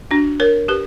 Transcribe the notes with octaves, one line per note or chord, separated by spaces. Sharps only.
D4 F#4
A#4 C#5
G4 B4